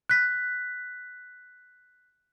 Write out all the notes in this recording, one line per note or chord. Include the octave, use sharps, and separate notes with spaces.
F#6 B6